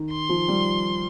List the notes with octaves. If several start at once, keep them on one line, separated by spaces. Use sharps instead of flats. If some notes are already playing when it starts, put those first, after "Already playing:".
Already playing: D#3
C6
F3
G3